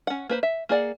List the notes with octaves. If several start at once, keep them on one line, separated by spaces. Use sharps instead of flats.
C#4 F#5
A#3 B4 C5
E5
A#3 G#4 D5 F#5